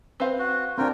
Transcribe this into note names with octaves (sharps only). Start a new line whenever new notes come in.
C4 B4 C5 F5
F#4
C4 D4 F4 A#4 G5